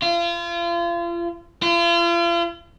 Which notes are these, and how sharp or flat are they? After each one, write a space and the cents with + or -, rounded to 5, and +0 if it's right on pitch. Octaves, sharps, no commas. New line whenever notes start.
F4 -35
F4 -40